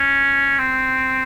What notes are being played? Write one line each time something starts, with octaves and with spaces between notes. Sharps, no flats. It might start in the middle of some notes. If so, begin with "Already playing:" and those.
Already playing: C#4
C4